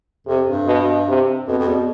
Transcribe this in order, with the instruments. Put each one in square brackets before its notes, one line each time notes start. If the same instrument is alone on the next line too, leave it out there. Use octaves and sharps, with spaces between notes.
[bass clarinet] F2 [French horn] C3
[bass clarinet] G2
[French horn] B2
C3
[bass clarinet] F2 [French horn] B2
[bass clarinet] F2
E2